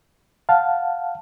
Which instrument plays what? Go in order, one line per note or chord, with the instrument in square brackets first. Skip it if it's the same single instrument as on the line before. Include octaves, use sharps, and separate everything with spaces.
[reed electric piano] F5 F#5 A5